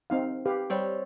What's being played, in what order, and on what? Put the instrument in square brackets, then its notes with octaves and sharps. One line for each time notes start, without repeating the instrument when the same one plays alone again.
[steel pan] C4 D#4 F5
G4 B4 F5
[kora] G3 C4 C#5